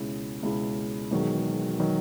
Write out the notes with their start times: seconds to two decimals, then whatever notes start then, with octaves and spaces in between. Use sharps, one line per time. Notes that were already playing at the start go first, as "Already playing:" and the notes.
Already playing: C#2 B2 G#3 C#4 E4
0.43 C#2 B2 G#3 C#4 E4
1.11 E1 E2 D#3 F#3
1.80 D#3 F#3